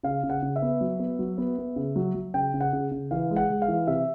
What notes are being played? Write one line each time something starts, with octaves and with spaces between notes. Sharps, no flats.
C#3 F5
C#3
F#5
C#3
E5
B3
F#3
B3
F#3
B3
B3
C#3
F#3
F#3
C#3 G5
C#3
F#5
C#3
C#3
E3 F5
G#3
F#5
G#3
F5
E3
C3 E5